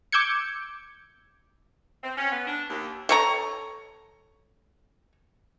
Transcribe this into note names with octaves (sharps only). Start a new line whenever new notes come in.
D6 E6 G6 G#6 C#7
C4
C#4
B3
D4
D#2
A4 C#5 A#5